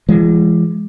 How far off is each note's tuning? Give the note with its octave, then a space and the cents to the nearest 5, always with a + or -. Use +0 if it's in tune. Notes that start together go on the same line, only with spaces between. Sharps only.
E3 +45 G#3 +0